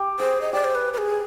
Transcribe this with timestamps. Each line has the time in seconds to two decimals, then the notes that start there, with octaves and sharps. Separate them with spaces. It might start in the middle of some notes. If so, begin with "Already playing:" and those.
Already playing: G4
0.19 G#4 C5
0.41 D#5
0.53 G4 D5
0.64 C5
0.75 B4
0.93 B4
0.98 G#4